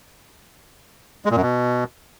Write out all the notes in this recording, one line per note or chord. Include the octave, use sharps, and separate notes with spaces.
G#3
A#2
F#2
B2